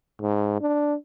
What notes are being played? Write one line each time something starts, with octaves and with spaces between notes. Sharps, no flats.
G#2
D4